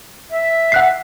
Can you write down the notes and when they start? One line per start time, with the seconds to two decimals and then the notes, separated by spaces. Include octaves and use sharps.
0.30 E5
0.72 F#5 F#6 C7